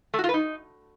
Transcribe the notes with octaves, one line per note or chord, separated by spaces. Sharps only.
A3
F#4
F4
B4
D#4